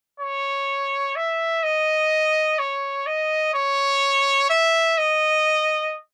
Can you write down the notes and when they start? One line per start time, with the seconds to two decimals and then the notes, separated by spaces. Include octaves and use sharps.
0.20 C#5
1.16 E5
1.63 D#5
2.59 C#5
3.07 D#5
3.54 C#5
4.50 E5
4.98 D#5